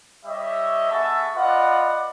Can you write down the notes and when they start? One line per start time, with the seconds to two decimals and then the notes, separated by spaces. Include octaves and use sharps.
0.25 G3 C#5 D#5 E5
0.91 B3 G#4 A4 E5 A5 C#6
1.36 F4 B4 D5 D#5 F#5